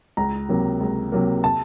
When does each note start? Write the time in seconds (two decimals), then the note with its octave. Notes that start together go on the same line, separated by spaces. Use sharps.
0.17 C#2 A#5
0.49 C3 F#3 A#3
0.80 C#2
1.12 C3 F#3 A#3
1.44 A5